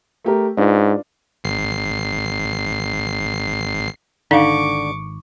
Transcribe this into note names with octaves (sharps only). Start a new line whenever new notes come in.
A3 G4 A#4
G#2 D4 F4 B4
G#1 C7
G#1 D3 D#4 F5 C#6 D6